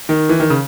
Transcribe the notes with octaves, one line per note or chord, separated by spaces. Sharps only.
D#3
E3
D#3
C#3